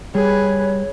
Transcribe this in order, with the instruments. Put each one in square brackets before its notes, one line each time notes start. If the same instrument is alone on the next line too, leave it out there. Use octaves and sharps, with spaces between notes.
[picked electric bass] G3 [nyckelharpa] G#4 B4 [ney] C#5